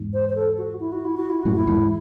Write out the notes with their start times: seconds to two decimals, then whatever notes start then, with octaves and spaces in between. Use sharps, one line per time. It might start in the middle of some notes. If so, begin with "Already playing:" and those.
Already playing: E2 G#2
0.14 C5
0.29 C5
0.36 A4
0.58 F#4
0.80 E4
0.92 F#4
1.05 E4
1.17 F#4
1.30 E4
1.43 F#2 A2 F#4
1.56 E4
1.67 E2 G#2